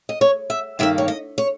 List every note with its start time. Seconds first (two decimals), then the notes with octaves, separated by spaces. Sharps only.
0.09 D#5
0.21 C#5
0.50 E5
0.79 G2 D#3 A#3 E5
0.98 C#5
1.08 D#5
1.38 C#5